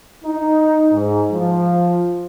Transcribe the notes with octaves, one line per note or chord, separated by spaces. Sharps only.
D#4
G#2
F3